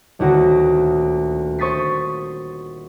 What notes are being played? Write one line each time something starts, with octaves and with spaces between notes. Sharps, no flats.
D#1 D2 F#4 A#6
C5 C#6 D#6 A6 B6 C7